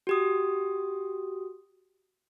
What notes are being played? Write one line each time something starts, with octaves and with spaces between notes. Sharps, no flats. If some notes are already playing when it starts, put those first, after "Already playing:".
F#4 G4 D#6